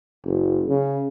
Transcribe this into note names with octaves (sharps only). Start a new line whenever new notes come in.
F#1
C#3